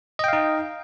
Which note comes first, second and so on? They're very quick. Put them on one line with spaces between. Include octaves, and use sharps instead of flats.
D#5 G5 F5 D#4